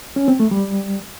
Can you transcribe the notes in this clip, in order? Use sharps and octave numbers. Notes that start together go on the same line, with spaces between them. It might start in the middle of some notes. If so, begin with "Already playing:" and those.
C#4
C4
A3
G3